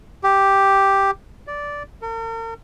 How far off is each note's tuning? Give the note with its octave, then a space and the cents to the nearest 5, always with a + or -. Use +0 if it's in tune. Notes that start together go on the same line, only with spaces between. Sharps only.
G4 +0
D5 -10
A#4 -45